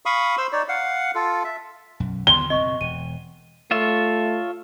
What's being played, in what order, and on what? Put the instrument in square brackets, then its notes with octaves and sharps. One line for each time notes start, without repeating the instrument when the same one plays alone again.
[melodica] F5 B5 C#6 D#6
C5 C6 E6
D#4 C#5 D5
F5 F#5
F4 A4
E5
[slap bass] B1 F#2
[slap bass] D#2 D3 B3 [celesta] G5 C6 [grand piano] G7
[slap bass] F#1 B2 C4 [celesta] D#5 C#6
[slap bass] E1 [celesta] D#7
[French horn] A3 [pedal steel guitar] F4 C#5 E5